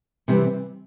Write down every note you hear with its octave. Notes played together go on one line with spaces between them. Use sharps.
C3 E3 G3 C4